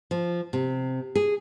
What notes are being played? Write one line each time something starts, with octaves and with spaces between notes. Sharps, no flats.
F3
C3
G#4